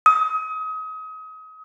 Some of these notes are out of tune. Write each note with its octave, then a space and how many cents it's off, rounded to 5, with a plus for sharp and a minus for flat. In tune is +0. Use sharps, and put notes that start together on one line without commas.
D#6 +30